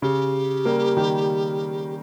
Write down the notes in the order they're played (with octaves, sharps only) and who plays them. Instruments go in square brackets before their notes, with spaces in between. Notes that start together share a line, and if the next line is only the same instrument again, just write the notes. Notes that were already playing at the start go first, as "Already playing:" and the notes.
[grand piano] C#3 [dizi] G4
[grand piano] G3 A#3
D#3 G3